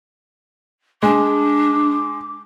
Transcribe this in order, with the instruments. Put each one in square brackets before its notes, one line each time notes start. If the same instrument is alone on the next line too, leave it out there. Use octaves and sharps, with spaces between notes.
[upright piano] G#3 [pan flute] D4 [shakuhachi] D6